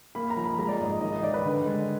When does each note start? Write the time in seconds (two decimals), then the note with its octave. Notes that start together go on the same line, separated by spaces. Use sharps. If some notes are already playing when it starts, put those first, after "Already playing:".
0.15 A#3 B5
0.30 A#5
0.37 F3
0.44 B5
0.59 G#3 A#5
0.69 D5
0.80 G#2 D#5
0.91 D#5
1.01 D#3 D#5
1.13 D#5
1.23 D#3 D5
1.34 B4
1.45 D3
1.66 G#3